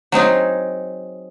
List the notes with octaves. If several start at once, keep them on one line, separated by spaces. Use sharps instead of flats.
F#3 C4 D#4 G#4